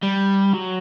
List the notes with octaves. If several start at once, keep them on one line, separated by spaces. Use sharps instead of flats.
G3
F#3